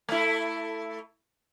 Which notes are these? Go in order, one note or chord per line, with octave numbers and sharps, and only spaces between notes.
A3 E4